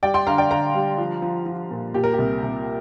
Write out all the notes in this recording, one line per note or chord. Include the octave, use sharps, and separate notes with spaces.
G3 D5 G5
G5 C6
D3 F5 A#5
D5 G5
D3 F5 A#5
G3
F3
F3
F3
A#2
A#2 G4
A#4
C2 G4
C2